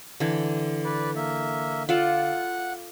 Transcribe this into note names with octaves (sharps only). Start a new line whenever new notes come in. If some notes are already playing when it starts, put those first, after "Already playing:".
D3 E3
B4 D5
A#3 E5
F4 A4 D5 F#5